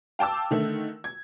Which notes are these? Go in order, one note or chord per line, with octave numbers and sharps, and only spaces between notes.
F5 G5 A5 D6 E6
D3 D#3 A3
G#6